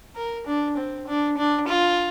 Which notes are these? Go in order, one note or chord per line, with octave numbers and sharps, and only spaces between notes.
A#4
D4
C4
D4
D4
F4